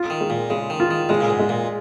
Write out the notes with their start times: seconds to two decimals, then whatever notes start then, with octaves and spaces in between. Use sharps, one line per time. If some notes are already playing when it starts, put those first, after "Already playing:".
Already playing: F4
0.10 D#3
0.20 G#3
0.30 A#2
0.50 C#3 G#3
0.70 D#3
0.80 F4
0.91 D#3
1.09 C#3 G#3
1.21 A#2
1.30 G#2
1.39 G#3
1.49 A#2